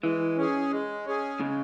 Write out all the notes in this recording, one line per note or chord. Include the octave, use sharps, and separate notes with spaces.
E3 G#3
C#4 G#4
G#3
C#4 G#4
C#3 G#3